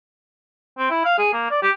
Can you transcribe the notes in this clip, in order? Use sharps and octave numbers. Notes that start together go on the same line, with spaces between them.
C4
E4
F5
G#4
A#3
D5
G4